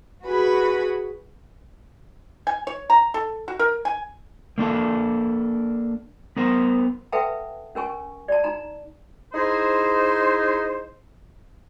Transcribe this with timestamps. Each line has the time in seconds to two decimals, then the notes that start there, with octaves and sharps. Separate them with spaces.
0.25 F#4 G#4 B4 B5
2.47 G#5
2.67 C#5
2.90 A#5
3.14 A4
3.48 F#4
3.59 A#4
3.85 G#5
4.58 A#3 D4 A4
6.37 B3 A#4 C5
7.12 A4 B4 E5 F#5 G5 A5
7.75 C#4 A#4 G#5 C#6
8.28 D5 A5
8.44 D#4 A#5
9.33 D#4 E4 G#4 C5